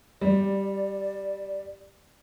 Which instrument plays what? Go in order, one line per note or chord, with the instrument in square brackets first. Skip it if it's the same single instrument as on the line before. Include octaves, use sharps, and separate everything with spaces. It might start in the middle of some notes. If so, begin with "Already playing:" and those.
[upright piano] G3 [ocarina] D5